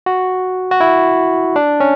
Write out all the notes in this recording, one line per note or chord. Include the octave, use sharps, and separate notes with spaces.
F#4
F#4
E4
D4
C#4